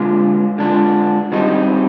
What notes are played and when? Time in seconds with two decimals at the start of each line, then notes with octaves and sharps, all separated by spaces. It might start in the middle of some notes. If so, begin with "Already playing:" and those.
Already playing: D3 G#3 D4 F4
0.58 D3 G#3 D4 F4
1.32 D#3 G3 C4 D#4